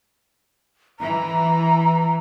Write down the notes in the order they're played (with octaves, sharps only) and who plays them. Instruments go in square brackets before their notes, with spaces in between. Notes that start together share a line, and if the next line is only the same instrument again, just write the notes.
[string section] E3 [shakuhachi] A#5